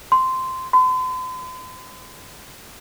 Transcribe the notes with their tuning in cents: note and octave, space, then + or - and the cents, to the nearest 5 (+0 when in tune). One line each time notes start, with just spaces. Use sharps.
C6 -10
C6 -45